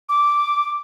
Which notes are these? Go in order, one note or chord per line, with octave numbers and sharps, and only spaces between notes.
D6